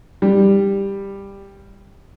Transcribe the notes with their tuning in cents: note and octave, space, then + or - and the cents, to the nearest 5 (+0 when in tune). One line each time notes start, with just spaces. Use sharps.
G3 +10